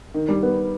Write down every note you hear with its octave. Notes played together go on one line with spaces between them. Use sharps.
D#3
G3
B3